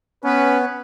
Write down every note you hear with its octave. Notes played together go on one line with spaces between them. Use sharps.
B3 C#4 B4